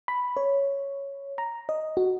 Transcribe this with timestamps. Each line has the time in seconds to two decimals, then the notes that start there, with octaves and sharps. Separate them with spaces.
0.08 B5
0.37 C#5
1.38 A#5
1.69 D#5
1.97 F#4